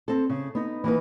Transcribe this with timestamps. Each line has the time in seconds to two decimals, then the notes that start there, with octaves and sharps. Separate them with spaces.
0.08 C4 A4
0.30 C#3
0.55 B3 D#4
0.84 E3 A#3 D#4 B4